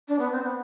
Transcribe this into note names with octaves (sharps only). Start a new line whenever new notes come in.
D4
B3
C4
B3